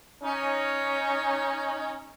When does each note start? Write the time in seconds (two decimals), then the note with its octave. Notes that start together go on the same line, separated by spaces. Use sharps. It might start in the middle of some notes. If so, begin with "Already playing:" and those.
0.23 C#4 D#4